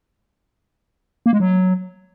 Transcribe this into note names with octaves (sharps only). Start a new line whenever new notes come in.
A#3
G#3
F#3